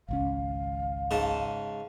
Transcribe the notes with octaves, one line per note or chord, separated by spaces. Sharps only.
G#1 C#2 C#4 F5
G#2 C#3 A5